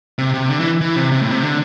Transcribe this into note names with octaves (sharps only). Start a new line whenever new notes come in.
C3
C3
D3
E3
E3
C3
C3
A2
C3
D3